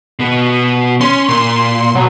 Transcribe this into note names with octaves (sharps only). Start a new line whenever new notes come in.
B2 B3
C#4 C6
A#2 C6
B2 F#3